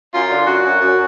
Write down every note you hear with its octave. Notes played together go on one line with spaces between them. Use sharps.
F#2 F4
D3
F#2 F#4
F#2
F#2